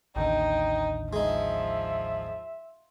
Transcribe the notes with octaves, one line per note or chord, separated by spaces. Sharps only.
A1 D#2 D3 D#4 G5
F3 G#3 D#4 E5